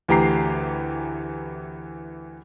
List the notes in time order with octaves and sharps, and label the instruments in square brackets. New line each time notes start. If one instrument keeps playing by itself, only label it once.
[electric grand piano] D2 E3 G4 A#5 C7